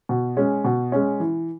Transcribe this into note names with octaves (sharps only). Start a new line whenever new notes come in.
B2
G#3 C#4
B2
G#3 C#4
E3